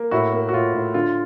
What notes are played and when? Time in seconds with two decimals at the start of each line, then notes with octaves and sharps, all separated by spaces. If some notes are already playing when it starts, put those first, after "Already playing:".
Already playing: A#3
0.11 A2 E4 F#4
0.32 A#3
0.49 F#4
0.53 A2 F4
0.74 A2
0.94 D3 F4